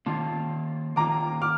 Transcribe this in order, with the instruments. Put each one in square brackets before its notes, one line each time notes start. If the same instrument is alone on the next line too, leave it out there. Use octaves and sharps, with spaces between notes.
[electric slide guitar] D#3 A#3 F4 [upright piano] A5 C6
[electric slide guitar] D#3 A#3 F4 [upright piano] A#5 D6
[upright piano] D6 F6